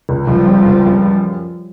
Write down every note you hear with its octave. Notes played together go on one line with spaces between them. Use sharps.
C#2
C#2 F3 G3
C4
C#2
F#2